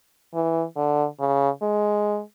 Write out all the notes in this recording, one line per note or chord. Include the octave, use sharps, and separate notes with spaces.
E3
D3
C#3
G#3